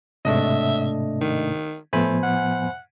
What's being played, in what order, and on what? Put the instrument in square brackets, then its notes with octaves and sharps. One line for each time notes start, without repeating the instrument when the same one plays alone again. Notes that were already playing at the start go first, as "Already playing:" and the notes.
[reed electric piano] G#2 C3 [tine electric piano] A3 D4 D#5 [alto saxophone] E5
[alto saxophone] D#3
[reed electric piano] A2 F3 B3 [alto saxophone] A3 [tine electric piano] C5 G#5 B5
[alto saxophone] F#5